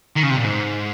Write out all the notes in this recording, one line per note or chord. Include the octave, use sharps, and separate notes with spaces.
D#3
C#3
C3
A#2
G#2